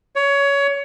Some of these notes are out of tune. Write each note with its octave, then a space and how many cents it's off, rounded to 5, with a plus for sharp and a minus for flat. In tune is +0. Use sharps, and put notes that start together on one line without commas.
C#5 +20